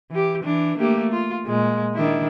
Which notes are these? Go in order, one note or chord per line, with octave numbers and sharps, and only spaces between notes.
E3 G4
E3 D4
A3 A#3 G4
F4
A#2 G#3
D#3 D4 E4